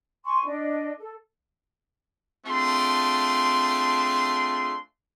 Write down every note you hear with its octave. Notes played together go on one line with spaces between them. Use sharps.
G#5 C6 C#6
D4 D#5
A4
A3 C4 D4 F4 G#4 C6